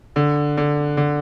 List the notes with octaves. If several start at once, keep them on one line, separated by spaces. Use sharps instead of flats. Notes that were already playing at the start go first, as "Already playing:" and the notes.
D3
D3
D3